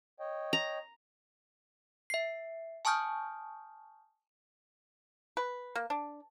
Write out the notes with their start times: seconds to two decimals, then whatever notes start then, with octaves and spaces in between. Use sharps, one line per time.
0.20 C#5 D#5 G5
0.53 A#5
2.10 E5 C7
2.85 G#5 A5 C#6 D#6 F6 G6
5.37 B4
5.76 A#3
5.90 D4